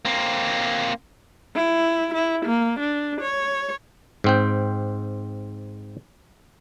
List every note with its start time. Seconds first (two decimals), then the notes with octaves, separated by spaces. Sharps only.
0.05 A#3 C4
1.55 E4
2.14 E4
2.46 A#3
2.80 D4
3.21 C#5
4.24 G#2 C4 G5